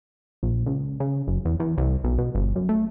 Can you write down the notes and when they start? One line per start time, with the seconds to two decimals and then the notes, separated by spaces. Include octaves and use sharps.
0.43 A#1
0.66 C#2
1.00 C#3
1.27 F#1
1.45 E2
1.60 E2
1.78 C2
2.04 B1
2.18 B2
2.35 G1
2.56 F#2
2.69 A3